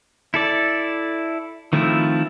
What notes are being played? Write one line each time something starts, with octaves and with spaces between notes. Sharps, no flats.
E4 A4 D5
D#3 F3 A3 C4 E4